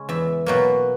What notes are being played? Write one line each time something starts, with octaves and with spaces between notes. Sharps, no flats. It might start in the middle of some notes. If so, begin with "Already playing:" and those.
Already playing: C#3 G#3 C#4
E2 E5
B2 F#3 A#3